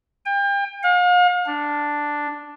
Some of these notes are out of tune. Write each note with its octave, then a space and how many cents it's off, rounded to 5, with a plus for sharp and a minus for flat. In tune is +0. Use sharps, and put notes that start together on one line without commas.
G5 +35
F5 +40
D4 +0